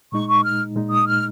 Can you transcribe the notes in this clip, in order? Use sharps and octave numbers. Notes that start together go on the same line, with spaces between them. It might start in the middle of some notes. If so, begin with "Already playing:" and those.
A#2 G#3 D#4 C#6
C#6
F6
A#2 G#3 D#4
D#6
F6